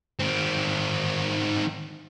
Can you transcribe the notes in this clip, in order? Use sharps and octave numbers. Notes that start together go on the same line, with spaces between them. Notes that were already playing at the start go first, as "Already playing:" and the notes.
D#3 C4